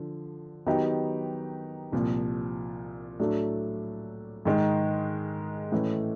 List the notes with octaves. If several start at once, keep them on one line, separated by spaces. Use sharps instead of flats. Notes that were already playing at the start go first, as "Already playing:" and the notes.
Already playing: D3 F3
D#3 F#3 B3 D#4 G4
C2 A#2 F3
A2 F#3 A3 D4
G#2 D#3 G#3
A2 E3 A3 C#4